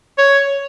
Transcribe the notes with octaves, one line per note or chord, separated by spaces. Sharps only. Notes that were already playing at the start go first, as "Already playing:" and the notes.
C#5